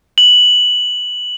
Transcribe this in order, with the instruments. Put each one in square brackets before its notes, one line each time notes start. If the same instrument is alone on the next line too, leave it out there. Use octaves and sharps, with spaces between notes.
[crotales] F#7